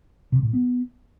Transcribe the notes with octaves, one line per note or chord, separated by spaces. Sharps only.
C3
A2
B3